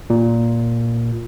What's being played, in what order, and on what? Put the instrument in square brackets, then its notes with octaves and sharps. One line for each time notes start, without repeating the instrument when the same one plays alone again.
[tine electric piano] A#2